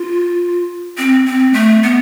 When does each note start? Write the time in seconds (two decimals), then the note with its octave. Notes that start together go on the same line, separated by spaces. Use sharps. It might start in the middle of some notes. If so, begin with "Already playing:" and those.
Already playing: F4
0.98 C4
1.26 C4
1.54 A3
1.83 B3